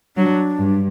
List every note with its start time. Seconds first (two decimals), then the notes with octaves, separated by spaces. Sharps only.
0.17 F#3 D4
0.58 G2